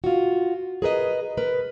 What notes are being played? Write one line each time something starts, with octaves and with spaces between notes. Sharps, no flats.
F4 F#4
G#4 A#4 B4 D#5
A#4 B4